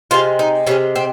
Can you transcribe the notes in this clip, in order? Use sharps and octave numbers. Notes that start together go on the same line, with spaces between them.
C3 D#3 G#3 F4
D#4
C3 D#3 G#3 C#4
C4